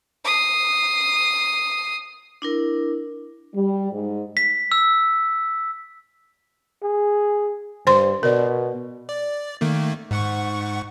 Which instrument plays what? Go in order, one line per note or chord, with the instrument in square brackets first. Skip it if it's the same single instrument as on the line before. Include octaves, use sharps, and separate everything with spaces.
[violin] D#6 C7
[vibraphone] D4 E4 A#4
[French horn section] G3
G#2
[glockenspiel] B6
E6
[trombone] G#4
[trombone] G2 [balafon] C5 C6
[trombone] B2 [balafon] A#4 D5
[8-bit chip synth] D5
D#3 A3 A#3
G#2 F#5 C#6